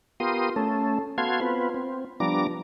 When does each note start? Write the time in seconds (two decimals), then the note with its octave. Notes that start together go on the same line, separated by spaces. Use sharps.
0.20 B3 F4 G4 A#4 C6 D#6
0.56 A3 C#4 A4
1.18 B3 F#4 A4 F5 C6 G#6
1.41 B3 C4 F4 B4
1.74 C4
2.20 F3 G3 B3 D4 A#5 D6